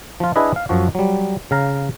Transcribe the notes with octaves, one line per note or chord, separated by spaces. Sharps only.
F3 F4
D4 E4 G#4 B4 D#5
F5
F#2 F3 F#4
F#3 G3
C#3 F5 A#5